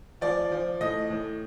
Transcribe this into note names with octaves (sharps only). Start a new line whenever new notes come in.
F3 D5
F3
A2 D#5
A2